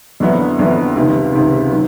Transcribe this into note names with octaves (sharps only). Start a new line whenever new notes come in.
F2 D3 F#3 B3 E4
F2 D3 F#3 B3 E4
C#2 C3 D#3
C#2 C3 D#3
D#3 F#3